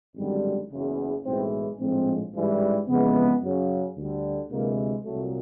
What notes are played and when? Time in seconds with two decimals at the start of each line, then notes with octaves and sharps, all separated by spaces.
0.16 G#1 F#2 D3 G3
0.71 F#1 E2 C#3
1.25 B1 A2 E3 G#3 C4
1.80 A#1 A2 F3 G#3 C4
2.33 A1 G#2 E3 G3
2.88 F2 C#3 E3 G#3 B3
3.42 F#2 C#3 F#3
3.96 D2 D3 G3
4.51 D2 C3 E3 G#3 A#3
5.05 C2 A#2 F#3 A3